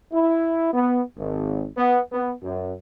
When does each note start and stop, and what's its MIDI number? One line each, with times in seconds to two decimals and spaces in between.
0.13 0.72 64
0.73 1.01 59
1.18 1.67 32
1.77 2.00 59
2.12 2.32 59
2.43 2.73 42